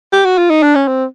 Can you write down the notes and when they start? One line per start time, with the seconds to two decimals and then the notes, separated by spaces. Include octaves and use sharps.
0.12 G4
0.25 F#4
0.38 F4
0.50 D#4
0.63 D4
0.75 C#4
0.88 C4